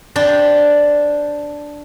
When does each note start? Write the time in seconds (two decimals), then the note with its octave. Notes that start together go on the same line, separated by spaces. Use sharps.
0.16 D4 C5 D5 G5